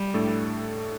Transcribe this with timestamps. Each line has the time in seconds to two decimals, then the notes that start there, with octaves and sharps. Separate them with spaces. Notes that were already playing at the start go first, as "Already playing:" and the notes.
Already playing: G3
0.14 A2 A3 D4 A4